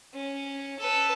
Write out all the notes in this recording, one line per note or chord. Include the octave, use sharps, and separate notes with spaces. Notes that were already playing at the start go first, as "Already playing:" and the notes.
C#4
A4 B4